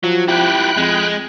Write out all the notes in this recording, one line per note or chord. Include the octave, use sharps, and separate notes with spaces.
F3 F#3
E4 G4 G5 B5 F#6
F2 G#3